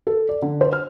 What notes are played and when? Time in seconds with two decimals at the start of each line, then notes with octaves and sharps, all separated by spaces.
0.07 A4
0.29 D5
0.42 D3
0.61 C5
0.73 F6